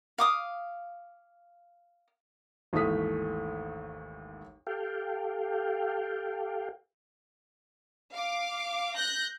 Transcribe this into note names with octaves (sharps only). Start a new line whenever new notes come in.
F5 D6 D#6
G#1 D#2 E3 A3 D#6 B6
G4 A4 F5 G5
F5 D6
F#6 G6 A#6